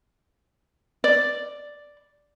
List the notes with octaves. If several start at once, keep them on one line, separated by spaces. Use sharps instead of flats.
D5